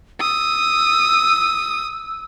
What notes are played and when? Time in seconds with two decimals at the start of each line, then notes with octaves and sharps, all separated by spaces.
0.20 D#6 E6